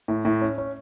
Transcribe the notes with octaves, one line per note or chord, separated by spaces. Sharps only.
A2
A2
C#4
C#4